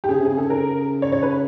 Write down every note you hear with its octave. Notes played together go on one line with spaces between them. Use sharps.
G4
C#3 G#4
C3
C#3 G#4
A4
A#4
C#5
C#5
B4